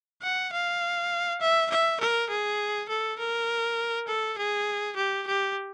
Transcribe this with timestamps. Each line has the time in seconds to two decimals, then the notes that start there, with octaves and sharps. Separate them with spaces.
0.23 F#5
0.53 F5
1.41 E5
1.70 E5
2.00 A#4
2.30 G#4
2.89 A4
3.19 A#4
4.08 A4
4.38 G#4
4.97 G4
5.27 G4